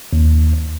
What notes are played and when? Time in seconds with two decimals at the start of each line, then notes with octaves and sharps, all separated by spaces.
0.13 D#2